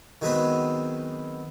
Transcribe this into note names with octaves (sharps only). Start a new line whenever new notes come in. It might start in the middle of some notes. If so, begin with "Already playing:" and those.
D#3 F#3 G#3 B3 C4 B4